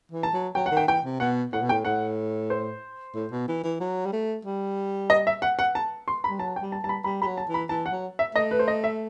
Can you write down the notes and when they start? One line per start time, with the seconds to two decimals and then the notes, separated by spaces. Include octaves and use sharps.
0.12 E3
0.23 A5
0.33 F#3
0.55 F#3 G5
0.66 F#5
0.72 D#3
0.77 G5
0.88 E3 G5
1.04 C3
1.20 B2 F#5
1.53 A2 F#5
1.62 B2
1.69 A2 G5
1.85 A2 F#5
2.50 C5
3.15 A2
3.31 B2
3.48 E3
3.63 E3
3.80 F#3
4.06 G3
4.13 A3
4.45 G3
5.10 D#5
5.27 E5
5.42 F#5
5.59 F#5
5.75 A5
6.08 C6
6.24 B5
6.30 G3
6.39 F#3 A5
6.56 G5
6.62 G3
6.72 A5
6.83 G3 A5
6.89 B5
7.04 G3 B5
7.22 G3 B5
7.27 F#3
7.37 A5
7.49 E3
7.54 B5
7.69 E3 A5
7.86 F#5
7.92 F#3
8.19 E5
8.35 A3 D#5
8.51 B4
8.59 C5
8.68 D#5
8.84 E5